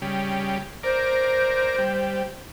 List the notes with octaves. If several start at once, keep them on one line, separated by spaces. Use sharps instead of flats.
C#3 G3
A#4 C5 D5
G3